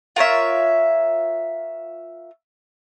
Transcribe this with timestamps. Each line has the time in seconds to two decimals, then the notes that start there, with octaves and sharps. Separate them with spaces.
0.16 F4 A#4 C#5 E5